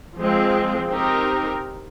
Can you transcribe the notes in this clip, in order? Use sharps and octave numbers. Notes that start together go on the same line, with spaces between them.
F3 G#3 C4
C4 D#4 G4 A#4